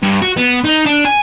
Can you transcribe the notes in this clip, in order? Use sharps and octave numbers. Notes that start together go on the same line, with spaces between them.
G2
F#4
B3
D#4
D4
G#5